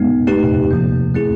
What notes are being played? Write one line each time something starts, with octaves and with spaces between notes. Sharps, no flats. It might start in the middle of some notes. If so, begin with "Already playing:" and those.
Already playing: G#3 B3 D#4
A3 C4 D#4 G4 B4
C3 F3 A#3
A3 C4 E4 G#4